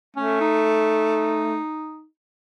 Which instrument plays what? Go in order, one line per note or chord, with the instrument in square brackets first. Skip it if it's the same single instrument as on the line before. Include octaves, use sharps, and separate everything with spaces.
[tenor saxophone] A3 [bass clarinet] C#4
[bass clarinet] D#4